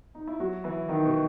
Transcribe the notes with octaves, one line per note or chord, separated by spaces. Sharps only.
D#4
E4
F#3 F#4
E3 E4
D#3 D#4
B2 B3